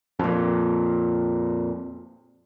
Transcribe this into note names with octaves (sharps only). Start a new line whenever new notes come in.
F2 A#2